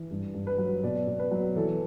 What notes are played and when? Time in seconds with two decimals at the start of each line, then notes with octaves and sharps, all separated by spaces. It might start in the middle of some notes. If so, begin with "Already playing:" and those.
Already playing: E3
0.11 G2
0.34 G2
0.47 B4
0.58 F#3
0.83 B2 D5
1.07 B2
1.19 B4
1.31 F#3
1.56 E3 A4